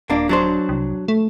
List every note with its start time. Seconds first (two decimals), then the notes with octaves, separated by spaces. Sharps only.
0.10 D#1 A#3 D4
0.29 F#3 D4 C5
0.69 C2
1.08 A3